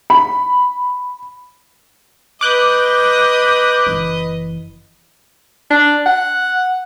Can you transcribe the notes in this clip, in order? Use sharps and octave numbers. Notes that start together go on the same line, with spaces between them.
B5
B4 D#5 D6 F#6 G6
F#1 E3
D4
F#5